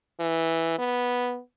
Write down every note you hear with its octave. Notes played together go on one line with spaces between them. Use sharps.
E3
B3